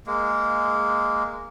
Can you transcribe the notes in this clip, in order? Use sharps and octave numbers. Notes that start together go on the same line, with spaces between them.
G#3 A#3